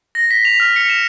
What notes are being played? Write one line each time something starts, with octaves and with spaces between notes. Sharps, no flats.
A#6
B6
F7
F6
C#7
E7